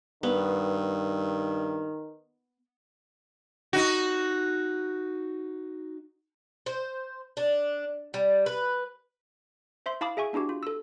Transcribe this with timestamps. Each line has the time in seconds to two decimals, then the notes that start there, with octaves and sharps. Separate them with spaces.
0.23 G2 D#3 B3
3.73 D#4 F#4
6.66 C5
7.37 D4
8.14 G3
8.46 B4
9.86 C5 E5 C6
10.01 E4 F5 A5 B5 D6 D#6
10.17 G#4 E5 G#5 C#6
10.33 B3 D4 E4 F#4 G4
10.49 F4
10.63 A4 E6